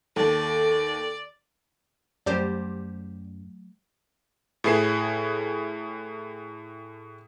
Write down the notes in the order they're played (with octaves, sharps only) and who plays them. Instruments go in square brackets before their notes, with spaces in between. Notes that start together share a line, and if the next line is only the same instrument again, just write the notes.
[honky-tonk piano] D#2 [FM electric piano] A4 [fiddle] D5
[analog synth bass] F#2 [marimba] F#3 A3 [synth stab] G3 G4 C5 [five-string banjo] D5
[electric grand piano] A2 E4 G#4 B4 C7 E7